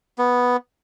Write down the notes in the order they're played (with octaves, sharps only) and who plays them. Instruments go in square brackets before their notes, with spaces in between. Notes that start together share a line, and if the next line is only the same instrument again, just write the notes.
[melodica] B3